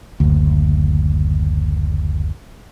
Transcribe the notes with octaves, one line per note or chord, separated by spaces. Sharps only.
F#1 D2